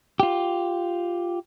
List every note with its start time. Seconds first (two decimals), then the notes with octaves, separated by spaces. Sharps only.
0.20 F4 G4